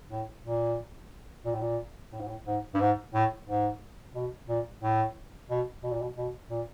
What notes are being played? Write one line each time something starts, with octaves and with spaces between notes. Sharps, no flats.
A2
A#2
A#2
A2
A#2
A2
G#2
A2
G#2
G2
G#2
A2
G#2
B2
A#2
A2
B2
B2
A#2
B2
B2
A#2